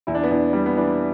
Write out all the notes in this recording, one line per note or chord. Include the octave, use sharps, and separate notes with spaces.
E2 E4
D4
B3
E2 D4
G3
B3
E3 D4